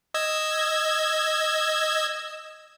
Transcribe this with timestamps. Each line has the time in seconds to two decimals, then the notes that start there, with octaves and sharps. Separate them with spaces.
0.14 D#5 E6 G#6